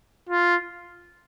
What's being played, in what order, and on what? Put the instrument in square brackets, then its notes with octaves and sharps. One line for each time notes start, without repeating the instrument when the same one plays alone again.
[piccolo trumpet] F4